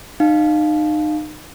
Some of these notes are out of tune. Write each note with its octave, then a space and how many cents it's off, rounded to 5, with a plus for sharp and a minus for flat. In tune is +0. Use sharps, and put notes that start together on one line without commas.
D#4 -30 F5 +5